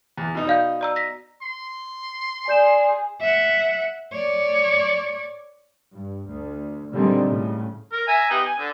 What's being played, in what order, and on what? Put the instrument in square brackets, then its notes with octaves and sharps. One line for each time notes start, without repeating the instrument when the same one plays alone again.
[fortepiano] E2
B2 D#4
[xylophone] D5 F5 G6
D5 A#5 E6
A#6 B6
[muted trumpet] C6
[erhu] G#4 [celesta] D5 G6 E7
[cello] E5 F#5
C#5 D5
[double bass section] G2
D2
A#2 D3 D#3 G3 G#3 C4
A2 C#3
[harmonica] A#4
E5 G#5 A#5
B3 D#4 G4
G#5
D3